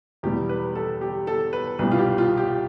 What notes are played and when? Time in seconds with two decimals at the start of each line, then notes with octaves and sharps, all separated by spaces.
0.23 E2 B2 G3 G4
0.49 B4
0.75 A4
1.01 G4
1.27 A4
1.53 B4
1.79 C2 B2 G3 B4
1.91 F4
1.98 G4
2.18 F4
2.38 G4